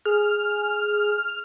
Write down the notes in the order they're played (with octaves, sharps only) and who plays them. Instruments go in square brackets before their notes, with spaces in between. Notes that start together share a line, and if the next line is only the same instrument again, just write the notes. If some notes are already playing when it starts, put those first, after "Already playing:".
[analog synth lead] G#4 [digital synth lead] F6